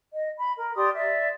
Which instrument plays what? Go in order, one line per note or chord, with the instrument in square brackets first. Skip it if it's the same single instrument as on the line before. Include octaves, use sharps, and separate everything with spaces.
[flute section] D#5
B5
A#4
G4 D5 C6 D#6
D5 E5